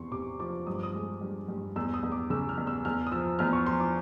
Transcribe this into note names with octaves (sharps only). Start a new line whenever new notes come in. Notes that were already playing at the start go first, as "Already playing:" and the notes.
Already playing: E2 C3 C6 C#6
C3 D6
F3 D6
G2 D#6
D6
D#6
G#3
G2
G2
E2 E6
D#6
E2
D6
C#3 E6
F6
E2
E6
E2 F6
D#6
F3 E6
E2 F6
C#6
F3 C6
D6